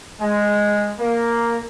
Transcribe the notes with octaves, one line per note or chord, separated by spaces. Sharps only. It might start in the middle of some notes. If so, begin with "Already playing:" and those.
G#3
A#3